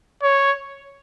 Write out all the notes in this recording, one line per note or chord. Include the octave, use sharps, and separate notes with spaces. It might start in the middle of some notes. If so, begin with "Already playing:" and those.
C#5